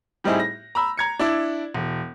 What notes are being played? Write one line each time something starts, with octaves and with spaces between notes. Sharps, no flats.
A2 G3 C4 D#4 E4 G#4
A#6
A#5 B5 E6
A#5 G#6 C#7
D4 E4 D5
E1